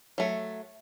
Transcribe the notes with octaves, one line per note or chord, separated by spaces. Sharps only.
F#3 A3